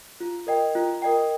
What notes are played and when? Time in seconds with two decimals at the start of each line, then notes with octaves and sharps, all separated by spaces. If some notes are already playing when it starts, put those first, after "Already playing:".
0.20 F4
0.47 A#4 D#5 G5
0.75 F4
1.02 A#4 D#5 G5